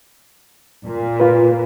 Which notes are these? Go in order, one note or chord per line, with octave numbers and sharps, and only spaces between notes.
A#2
F4 B4